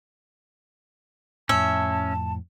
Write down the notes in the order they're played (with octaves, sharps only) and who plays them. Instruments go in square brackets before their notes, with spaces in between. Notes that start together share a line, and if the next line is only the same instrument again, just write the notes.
[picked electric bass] F2 A2 [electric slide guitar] C#4 [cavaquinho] E5 [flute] A5